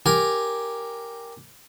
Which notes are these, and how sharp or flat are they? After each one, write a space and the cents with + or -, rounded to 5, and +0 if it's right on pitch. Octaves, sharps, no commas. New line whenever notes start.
G4 +0 A#4 +0 G#5 +0